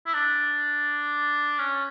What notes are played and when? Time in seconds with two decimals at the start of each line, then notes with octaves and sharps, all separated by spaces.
0.06 E4
0.14 D4
1.59 C#4